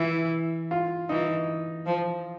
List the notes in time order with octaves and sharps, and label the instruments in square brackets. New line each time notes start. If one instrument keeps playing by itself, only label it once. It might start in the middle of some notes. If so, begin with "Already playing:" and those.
Already playing: [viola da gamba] E3 [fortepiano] E4
[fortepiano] F4
[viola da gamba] E3 [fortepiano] D#4
[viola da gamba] F3